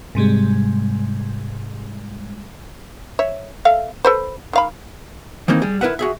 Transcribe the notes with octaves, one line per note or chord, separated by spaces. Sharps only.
G#2 C3 G3 G#3
C#5 E5
A4 E5 F5
A4 B4 C5
D#3 F5 B5
D#3 E3 A#3 C4 D#4
G3 G#4
E4 A#4 B4 E5 F#5
F#4 G#4 E5